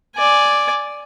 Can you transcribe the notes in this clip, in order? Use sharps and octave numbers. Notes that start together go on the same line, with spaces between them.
D5 G#5